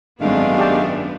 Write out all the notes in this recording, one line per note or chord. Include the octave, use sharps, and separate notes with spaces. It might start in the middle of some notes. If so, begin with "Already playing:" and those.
G#1 F#2 D#3 G#3 A3 B3 D4 F5
G4 A5